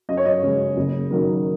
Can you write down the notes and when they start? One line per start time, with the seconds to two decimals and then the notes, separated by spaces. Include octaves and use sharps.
0.09 F#2 D#5
0.17 C#5
0.25 D#5
0.43 C#3 G#3
0.77 F#1
1.10 F#2 D#3 F#3 A#3